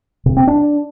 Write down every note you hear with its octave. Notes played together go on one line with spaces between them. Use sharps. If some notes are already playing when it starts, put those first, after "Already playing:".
C3
C4
D4